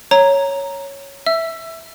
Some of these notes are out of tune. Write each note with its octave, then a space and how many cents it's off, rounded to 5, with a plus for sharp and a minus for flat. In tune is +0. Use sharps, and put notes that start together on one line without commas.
C#5 +0 A#5 +0
E5 +0 E6 +20